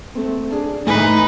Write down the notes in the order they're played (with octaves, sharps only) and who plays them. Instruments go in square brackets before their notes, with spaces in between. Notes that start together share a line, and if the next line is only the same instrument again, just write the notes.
[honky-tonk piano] A3 C4
D4 G#4
[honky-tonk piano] A2 D#3 G#5 [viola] D#4 B4